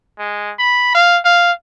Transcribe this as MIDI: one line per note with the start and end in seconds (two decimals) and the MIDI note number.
0.19 0.53 56
0.59 0.90 83
0.95 1.19 77
1.25 1.52 77